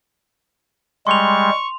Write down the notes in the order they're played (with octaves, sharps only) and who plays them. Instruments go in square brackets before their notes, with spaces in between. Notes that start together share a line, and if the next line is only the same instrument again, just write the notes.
[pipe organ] G3 G#3 [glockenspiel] C6 F7 [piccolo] C#6